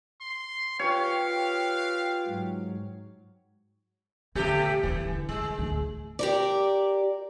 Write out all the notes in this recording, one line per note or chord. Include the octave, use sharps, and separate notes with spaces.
C6
F4 G4 B4 C#5 F5 G5
G#2 F#3
A#2 D3 D#3 A3 G4
D#1 D#3 E3
D3
D2 G3 G#3
D2 A2
G4 A#4 D5